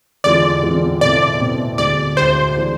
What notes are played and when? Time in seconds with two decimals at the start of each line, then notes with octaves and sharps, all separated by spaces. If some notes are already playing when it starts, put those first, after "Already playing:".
0.24 E2 D3 G#3 C4 F4 D5
0.63 E2 D3 G#3 C4 F4
1.01 B2 A3 C4 E4 D5
1.40 B2 A3 C4 E4
1.78 D2 D3 G#3 D4 D5
2.17 D2 D3 G#3 D4 C5
2.57 E3 G#3 D4